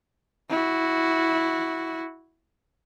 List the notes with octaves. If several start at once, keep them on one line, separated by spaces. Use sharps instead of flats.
E4 F#4